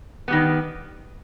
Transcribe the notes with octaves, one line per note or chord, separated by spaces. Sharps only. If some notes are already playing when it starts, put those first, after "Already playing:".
D#3 G3 B3